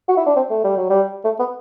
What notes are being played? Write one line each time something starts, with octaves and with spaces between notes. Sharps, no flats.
F#4
E4
D4
C4
A3
G3
F#3
G3
A3
B3